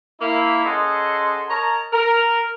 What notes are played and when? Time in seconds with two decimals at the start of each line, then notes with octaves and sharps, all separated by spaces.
0.21 A#3 E4
0.65 C#4 G#4 A4 D#5 F#5 C6
1.49 A#4 C#5 D#5 A5 A#5
1.93 A#4